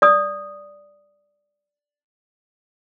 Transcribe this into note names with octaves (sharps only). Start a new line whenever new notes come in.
D5 D#6